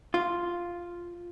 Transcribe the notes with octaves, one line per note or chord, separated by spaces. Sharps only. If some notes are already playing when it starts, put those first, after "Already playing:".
F4